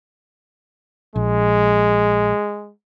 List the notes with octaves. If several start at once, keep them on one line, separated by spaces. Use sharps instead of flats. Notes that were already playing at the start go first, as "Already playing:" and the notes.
A#1 G#3